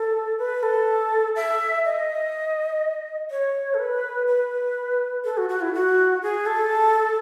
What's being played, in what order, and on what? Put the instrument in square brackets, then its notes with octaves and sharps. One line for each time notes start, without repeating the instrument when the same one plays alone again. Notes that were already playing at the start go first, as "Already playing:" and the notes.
Already playing: [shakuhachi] A4
B4
A4
E5
D#5
C#5
A4
B4
B4
A4
F#4
F#4
E4
F#4
G#4
A4